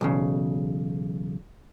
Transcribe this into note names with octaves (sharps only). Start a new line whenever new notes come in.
B1 E2 C#3